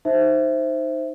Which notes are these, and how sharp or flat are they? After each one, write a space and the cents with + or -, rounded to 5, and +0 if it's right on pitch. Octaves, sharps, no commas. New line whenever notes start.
D#4 +0 C5 +0 E5 +0